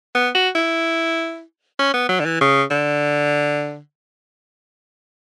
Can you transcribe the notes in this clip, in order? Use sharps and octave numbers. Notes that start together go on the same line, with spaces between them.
B3
F#4
E4
C#4
B3
F#3
D3
E3
C#3
D3